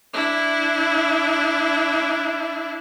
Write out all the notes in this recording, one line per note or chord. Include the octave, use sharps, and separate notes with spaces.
D4 E4